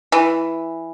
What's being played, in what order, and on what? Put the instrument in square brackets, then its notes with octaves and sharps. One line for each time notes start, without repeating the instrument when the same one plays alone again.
[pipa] E3